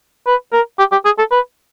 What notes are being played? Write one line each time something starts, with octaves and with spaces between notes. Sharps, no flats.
B4
A#4
G4
G4
G#4
A4
B4